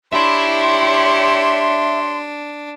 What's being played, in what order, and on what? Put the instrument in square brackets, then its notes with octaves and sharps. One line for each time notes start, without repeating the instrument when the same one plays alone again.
[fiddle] D4 [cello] G4 C#5 [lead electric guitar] E5 B5 [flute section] C6